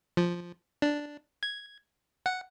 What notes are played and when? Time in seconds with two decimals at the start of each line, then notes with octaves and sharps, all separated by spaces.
0.17 F3
0.82 D4
1.43 G#6
2.26 F#5